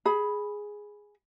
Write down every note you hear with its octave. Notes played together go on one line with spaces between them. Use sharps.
G#4 B5